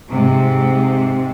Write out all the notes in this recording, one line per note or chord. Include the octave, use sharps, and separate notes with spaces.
G#2 C3